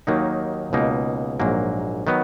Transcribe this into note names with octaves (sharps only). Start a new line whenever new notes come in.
D#2 D#3 F#3 A#3 D#4
C#2 B2 A#3 D#4
A#1 G#2 F#3 A#3
D#3 F#3 B3